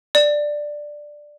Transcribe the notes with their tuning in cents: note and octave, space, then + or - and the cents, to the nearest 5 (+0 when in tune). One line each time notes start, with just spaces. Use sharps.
D5 +10